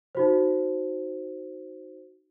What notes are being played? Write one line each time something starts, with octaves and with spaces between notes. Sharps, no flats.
D#4 F#4 C5